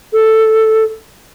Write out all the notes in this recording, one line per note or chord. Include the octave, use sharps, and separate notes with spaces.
A4